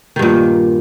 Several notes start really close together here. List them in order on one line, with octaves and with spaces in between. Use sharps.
D#3 G2 A#2